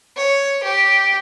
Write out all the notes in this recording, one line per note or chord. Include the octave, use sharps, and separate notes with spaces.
C#5
G4